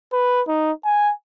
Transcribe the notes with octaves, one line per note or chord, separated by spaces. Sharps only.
B4
D#4
G#5